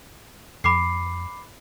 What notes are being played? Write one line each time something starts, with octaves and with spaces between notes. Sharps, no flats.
F2 B5 D6 C7